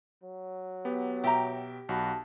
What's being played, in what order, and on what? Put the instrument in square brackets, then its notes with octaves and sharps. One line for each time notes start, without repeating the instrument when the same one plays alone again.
[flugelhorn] F#3
[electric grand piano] B3 G4
[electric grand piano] B2 E5 G5 [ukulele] G4 A#5
[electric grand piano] B1 F#4 B5 [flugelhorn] A5